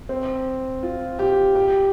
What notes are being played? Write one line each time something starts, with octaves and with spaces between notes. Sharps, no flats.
C4
F4
G4
G4